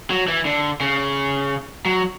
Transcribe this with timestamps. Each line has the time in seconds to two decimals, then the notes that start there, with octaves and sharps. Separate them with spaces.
0.10 F#3
0.28 E3
0.45 D3
0.81 C#3
1.85 F#3